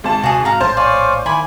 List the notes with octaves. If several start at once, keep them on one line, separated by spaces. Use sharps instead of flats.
G#1 A5
D#1 C3 F#4 G#4
G#2 F#4 F5 A#5
A#1 A2 F3 C5 A5
C#5 D5 F5 G#5
D#3 A#3 E4 G#5 B5